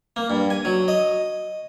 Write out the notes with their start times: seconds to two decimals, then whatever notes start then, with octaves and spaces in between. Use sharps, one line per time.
0.16 A#3
0.30 G2
0.50 G#5
0.65 F#3
0.88 D#5